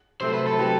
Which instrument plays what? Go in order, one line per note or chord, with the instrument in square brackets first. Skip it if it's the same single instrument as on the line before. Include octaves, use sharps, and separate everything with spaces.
[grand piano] C3 F#3 A3 C4 [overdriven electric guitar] C5
[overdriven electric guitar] B4
A4
[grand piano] F#3 C4 G4 B4